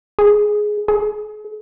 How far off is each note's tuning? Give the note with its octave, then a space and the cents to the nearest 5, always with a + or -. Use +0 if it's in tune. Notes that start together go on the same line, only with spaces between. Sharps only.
G#4 +10
G#4 +40